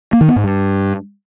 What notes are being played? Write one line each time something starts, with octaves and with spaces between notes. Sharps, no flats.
A#3
D#3
B3
G#2
G2